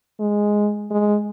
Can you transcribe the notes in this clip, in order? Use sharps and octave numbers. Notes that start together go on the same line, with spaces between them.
G#3
G#3